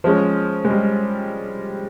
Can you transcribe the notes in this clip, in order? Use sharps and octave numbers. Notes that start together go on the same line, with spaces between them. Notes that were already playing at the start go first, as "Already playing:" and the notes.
F3 G#3 C#4
G#3
G3